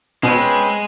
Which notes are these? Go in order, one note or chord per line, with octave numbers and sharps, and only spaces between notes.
B2 G#3 C4 C#4 B4